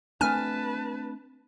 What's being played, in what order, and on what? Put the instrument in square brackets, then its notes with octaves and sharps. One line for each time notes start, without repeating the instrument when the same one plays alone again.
[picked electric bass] A3 C4 D4 [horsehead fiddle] B4 A5 [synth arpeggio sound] G#5 F6